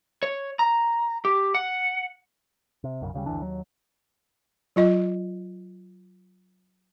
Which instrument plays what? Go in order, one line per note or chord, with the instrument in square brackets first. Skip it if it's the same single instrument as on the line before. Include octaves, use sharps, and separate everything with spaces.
[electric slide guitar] C#5
A#5
G4
F#5
[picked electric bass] C3
B1 F#2 A#2 C#3
D2 C#3 F3 G3
F#1 D2 E3 D4
D#2 F#3
[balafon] F#3 F4 D#5